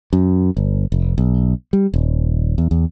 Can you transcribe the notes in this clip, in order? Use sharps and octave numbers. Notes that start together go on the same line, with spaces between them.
F#2
G1
F1
B1
G3
D#1
E2
E2